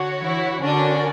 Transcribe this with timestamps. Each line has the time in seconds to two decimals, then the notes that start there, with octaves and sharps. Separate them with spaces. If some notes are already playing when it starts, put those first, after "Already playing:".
Already playing: D3 D4 F#4 C#5 F#5
0.20 E3 E4
0.61 D3 C#4 D4 F#4 A#4 D5